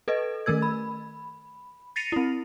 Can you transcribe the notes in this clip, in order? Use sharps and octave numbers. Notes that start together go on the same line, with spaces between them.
A4 B4 D#5
D#3 A3 A#4 E6 G#6
B5
A6 A#6 C7 C#7 D#7 F7
C4 E4